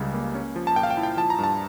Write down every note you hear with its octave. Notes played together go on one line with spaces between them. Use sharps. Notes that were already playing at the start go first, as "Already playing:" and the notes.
Already playing: C#2 C#3 G3
A#3
C#4
F3
A5
A#2 G5
F5
G5
E4
G5
F3 A5
A#5
G2
A5